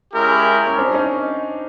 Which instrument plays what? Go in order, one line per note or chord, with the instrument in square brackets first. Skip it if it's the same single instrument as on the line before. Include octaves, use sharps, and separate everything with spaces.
[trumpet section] G#3 C#4 E4 G4 A#4
[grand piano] C#4
C4 D4
C#4 D#4